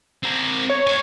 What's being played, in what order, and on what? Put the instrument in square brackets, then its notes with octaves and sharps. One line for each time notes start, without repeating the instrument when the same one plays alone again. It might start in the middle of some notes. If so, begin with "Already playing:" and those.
[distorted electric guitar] C4 A#4
[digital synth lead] C#5
[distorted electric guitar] C5 G#5